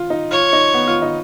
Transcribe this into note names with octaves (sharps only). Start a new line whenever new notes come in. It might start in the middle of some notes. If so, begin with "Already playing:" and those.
Already playing: F4
D#4
F4 C#5
D#4
B3
F4
D#4